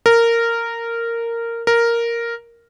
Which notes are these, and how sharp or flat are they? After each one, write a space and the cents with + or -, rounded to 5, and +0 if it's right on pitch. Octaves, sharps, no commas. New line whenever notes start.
A#4 -10
A#4 +0